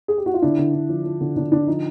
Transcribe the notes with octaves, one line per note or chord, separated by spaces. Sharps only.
G#4
G4
F#4
F4
D3 D4 E4
D3
D3
F3
F3
D3
D3 D4
D3 D4
F3 D#4